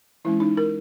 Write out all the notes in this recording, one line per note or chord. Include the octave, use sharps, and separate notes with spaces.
E3 G#3 C#4 E4
D#4
A#4